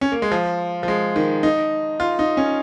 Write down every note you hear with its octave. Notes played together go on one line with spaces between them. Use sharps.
C#4
A#3
G#3
F3
F3
G#3
D#3
D#4
F4
D#4
C#4